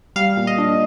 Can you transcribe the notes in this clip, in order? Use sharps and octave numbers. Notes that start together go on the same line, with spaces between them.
G3 F5
A#2
D#5
D4